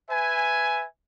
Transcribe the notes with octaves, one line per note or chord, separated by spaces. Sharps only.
B4 E5 G#5